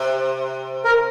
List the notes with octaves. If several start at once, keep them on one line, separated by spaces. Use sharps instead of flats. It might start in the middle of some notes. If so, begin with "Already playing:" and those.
Already playing: C3
A#4